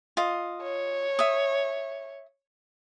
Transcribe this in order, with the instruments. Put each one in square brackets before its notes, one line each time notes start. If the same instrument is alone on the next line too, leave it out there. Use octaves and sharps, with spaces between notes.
[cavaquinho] F4 D#5
[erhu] C#5
[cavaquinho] E5 D#6